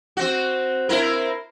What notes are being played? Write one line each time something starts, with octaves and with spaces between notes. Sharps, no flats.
C4 F#4
C4 E4 A#4